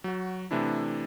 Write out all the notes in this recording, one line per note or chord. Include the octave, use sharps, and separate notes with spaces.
F#3 F#4
C3 E3 A3 D4 E4